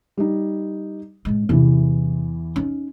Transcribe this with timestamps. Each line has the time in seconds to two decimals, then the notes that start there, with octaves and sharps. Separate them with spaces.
0.17 G3 D#4
1.25 A2 G#3
1.49 E2 C3 E3 C#4
2.56 C#4 D#4